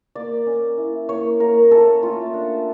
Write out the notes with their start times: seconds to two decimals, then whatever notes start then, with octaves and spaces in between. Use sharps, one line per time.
0.15 A#3 D5
0.46 C#4
0.78 E4
1.09 A#3 C#5
1.40 A#3 A#4
1.71 C#4 A4
2.03 A3 F4
2.34 D4